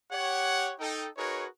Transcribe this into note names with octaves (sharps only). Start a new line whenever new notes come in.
G4 C#5 F#5
D#4 A4 G5
D#4 F#4 G#4 A#4 B4 C#5